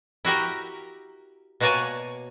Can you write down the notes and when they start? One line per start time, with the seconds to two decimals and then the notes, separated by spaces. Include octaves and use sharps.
0.25 E4 F#4 G4 A#4
1.60 B2 A#3 F#4 C#5 D5 G#5